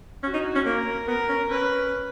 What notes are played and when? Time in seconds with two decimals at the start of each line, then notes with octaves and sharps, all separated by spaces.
0.23 C#4 F#4
0.34 D#4
0.55 C#4
0.65 A#3 A#4
1.08 B3 A#4
1.29 C#4
1.51 C#4 B4